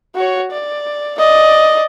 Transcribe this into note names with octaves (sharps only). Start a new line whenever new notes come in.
F#4 C#5
D5
D5 D#5